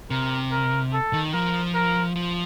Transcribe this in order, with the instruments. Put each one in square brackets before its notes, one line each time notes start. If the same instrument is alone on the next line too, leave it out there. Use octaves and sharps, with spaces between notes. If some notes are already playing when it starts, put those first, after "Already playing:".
[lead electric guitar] C3 [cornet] A#4
[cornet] A#4
A4
[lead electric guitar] D#3
[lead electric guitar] F3 [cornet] A#4
[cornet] A#4
[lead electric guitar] F3